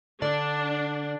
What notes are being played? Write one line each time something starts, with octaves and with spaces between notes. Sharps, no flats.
D3 D4 D5